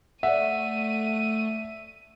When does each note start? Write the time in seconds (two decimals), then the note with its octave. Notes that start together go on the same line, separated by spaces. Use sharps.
0.23 A3 D5 E5 F#5 D#7